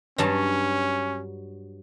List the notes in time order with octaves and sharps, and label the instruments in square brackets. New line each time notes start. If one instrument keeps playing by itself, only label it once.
[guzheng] G2 F#3 A5 [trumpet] C#4